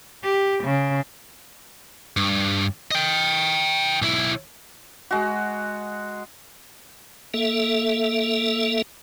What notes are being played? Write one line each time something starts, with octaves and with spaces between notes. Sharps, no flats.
G4
C#3
G2
D#5 G5
B1 E4
G#3 F#4
A#3 A4 E5